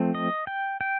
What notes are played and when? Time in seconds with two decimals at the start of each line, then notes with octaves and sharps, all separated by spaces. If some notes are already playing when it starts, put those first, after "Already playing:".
Already playing: F3 A3 C4
0.15 D#5
0.47 G5
0.81 G5